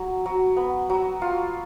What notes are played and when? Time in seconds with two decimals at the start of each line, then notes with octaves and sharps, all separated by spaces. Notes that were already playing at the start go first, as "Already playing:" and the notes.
Already playing: F#3
0.26 F#3
0.57 B3
0.90 F#3
1.22 F4